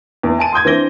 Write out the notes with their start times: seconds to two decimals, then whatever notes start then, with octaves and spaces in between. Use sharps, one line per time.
0.23 E2
0.38 G#5 A5 D#7
0.53 C6 D#6 G6 G#6
0.65 E3 C4 D4 A#6 G7